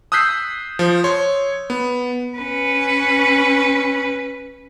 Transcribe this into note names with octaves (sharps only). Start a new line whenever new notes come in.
D#6 E6 F#6 G6 B6 C7
F3
C#5 C6
B3
C#4 B4